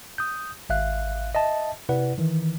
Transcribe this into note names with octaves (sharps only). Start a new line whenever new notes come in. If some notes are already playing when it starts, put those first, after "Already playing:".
D#6 G6
G#1 E5 F5 F#6
D#5 E5 A5
C3 E4 B4 D5 F#5
D#3 E3